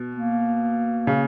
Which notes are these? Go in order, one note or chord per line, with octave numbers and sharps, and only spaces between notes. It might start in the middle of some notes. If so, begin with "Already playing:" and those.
Already playing: B2
A#3
C#3